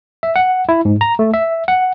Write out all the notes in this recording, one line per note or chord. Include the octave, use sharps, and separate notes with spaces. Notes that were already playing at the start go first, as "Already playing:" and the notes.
E5
F#5
E4
G#2
A#5
A3
E5
F#5